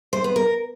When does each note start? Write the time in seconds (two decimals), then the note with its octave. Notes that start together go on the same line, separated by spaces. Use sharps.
0.13 C5
0.24 B3
0.36 A#4